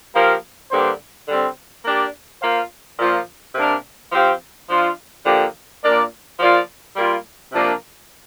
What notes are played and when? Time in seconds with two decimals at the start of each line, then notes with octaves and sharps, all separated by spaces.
0.14 F3 A#3 G4 A#4 F5
0.71 G2 D3 A#3 G4 C5
1.27 D3 G3 C4
1.85 A#3 D4 G4 D5
2.41 A#3 F4 C5 F5
2.98 A#2 F3 A#3 F4
3.55 C3 A#3 D4 A#4
4.12 F3 C4 G4 C5 F5
4.69 F3 D4 F4
5.25 D3 F3 A#3 G4
5.82 A#2 A#3 D4 A#4 D5
6.39 F3 A#3 F4 D5
6.96 G3 A#3 F4
7.52 C3 F3 A#3 D4 A#4